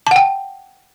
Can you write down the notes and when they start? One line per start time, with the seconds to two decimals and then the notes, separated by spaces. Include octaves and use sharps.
0.07 A5
0.11 F#5
0.16 G5